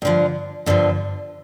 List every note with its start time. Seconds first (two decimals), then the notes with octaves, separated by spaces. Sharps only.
0.02 G2 D3 F3
0.66 G2 D3 F3